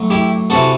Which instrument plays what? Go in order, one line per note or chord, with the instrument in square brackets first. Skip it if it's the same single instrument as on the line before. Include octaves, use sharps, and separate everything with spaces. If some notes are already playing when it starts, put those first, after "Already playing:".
Already playing: [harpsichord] A2 F#3
E4 G4
C3 E3 F#4 A4